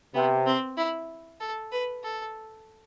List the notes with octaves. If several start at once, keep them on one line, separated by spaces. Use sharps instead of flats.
C3 B3
C4
E4
A4
B4
A4